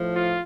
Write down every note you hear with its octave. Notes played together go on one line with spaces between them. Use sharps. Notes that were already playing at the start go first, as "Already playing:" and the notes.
Already playing: A2 F3
F4